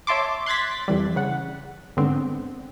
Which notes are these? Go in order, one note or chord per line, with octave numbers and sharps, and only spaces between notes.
C#5 E5 A5 C6 D6
C6 F#6 G#6 A6 B6
F2 E3 G3
C#3 F#5
G#2 D3 B3 C4